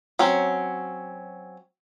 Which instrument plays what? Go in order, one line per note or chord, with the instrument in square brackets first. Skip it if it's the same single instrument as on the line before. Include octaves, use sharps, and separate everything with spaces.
[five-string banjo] F#3 C4 C#4